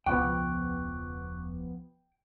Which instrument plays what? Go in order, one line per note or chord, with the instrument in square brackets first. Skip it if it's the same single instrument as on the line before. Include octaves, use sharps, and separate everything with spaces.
[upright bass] E1 [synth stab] C#2 F3 B3 [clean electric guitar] G5 [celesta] C#6 D6 F#6